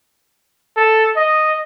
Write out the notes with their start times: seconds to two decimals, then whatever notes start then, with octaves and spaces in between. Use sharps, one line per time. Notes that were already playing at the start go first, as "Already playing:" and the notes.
0.77 A4
1.16 D#5